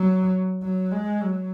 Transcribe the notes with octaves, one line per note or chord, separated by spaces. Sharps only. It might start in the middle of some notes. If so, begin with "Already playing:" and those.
Already playing: F#3
F#3
G#3
F#3